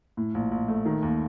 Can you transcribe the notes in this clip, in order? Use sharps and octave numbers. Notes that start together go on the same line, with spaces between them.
A2
A#1
A#1
A3
D#3
D#2